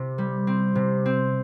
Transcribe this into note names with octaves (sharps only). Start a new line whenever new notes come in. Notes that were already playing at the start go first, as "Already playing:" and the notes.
Already playing: C3
G3
C4
C3
C4